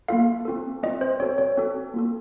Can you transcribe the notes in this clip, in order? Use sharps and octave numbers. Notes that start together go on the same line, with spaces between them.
A#3 F4 A4 F5
C4 F4 A4
C4 F4 A4 D#5
C5
C4 F#4 A4 C#5
C#5
C4 F#4 A4
A#3 F4 A4